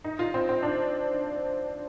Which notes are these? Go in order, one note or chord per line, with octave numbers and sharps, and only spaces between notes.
D#4
F4
C4
C4
D4